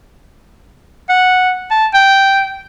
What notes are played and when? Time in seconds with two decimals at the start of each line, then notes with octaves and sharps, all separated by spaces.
1.09 F#5
1.71 A5
1.94 G5